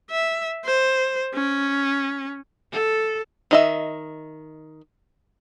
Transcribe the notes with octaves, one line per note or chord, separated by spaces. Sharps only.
E5
C5
C#4
A4
D#3 D#5 E5